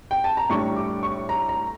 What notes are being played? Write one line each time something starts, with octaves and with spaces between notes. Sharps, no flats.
G5
A5
A#5
A2 G3 D4 C#6
D6
C#6
A#5
A#5